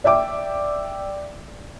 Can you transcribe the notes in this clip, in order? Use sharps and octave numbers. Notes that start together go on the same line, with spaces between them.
D5 E5 G5 D6